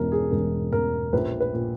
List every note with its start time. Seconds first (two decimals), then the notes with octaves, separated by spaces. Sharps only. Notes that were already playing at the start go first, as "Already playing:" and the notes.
Already playing: E1 B2 A#4
0.12 G#4
0.31 E1 A#4
0.72 E1 A#4
1.13 A#1 B4
1.41 B4
1.54 A#2